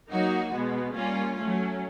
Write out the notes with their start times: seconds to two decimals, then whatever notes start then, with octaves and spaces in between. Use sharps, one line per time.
0.11 F#3 A#3 D#4 F#4
0.53 B2 G#3 B3
0.95 G3 A#3 C#4 F4
1.38 F#3 A3 C#4